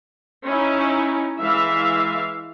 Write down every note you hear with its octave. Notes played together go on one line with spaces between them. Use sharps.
C#4 D#4 E4
E3 G#3 E5 F5